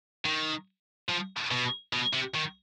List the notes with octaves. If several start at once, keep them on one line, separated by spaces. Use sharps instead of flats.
D#3
F3
B2
B2
C3
D#3